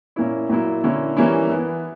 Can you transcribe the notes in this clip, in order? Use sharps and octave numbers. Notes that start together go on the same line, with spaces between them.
A#2 A#3 C#4 E4
A#2 F#3 A#3 E4
D3 A#3 C#4 E4
E3 G3 A#3 C#4 E4
E3 B3 E4